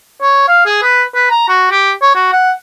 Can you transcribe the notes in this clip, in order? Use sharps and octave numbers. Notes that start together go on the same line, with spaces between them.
C#5
F5
G#4
B4
B4
A#5
F#4
G4
C#5
F#4
F#5